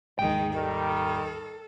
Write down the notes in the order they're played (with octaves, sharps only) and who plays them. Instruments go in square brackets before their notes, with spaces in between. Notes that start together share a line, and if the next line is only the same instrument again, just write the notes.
[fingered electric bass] G#1 D#2 [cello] D#3 G#3 [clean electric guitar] G5
[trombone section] D#3 G3 [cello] A4